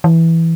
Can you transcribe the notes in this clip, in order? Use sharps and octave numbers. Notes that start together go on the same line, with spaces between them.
E3